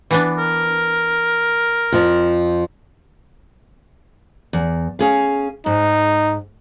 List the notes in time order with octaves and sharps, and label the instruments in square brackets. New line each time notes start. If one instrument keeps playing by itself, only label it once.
[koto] E3 B3 D4
[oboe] A#4
[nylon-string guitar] F2 F3
[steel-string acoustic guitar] E2
C#4 G#4 F5
[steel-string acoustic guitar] G#2 [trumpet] D#4